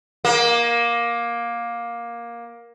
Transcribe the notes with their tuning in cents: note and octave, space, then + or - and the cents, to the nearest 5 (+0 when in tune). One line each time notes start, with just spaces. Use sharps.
A#3 +15